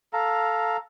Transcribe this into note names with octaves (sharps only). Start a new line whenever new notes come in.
A4 F5 A#5